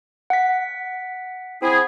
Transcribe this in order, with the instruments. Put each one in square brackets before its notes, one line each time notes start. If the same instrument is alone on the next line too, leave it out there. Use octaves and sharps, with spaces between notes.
[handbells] F#5 B6
[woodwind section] C4 E4 G#4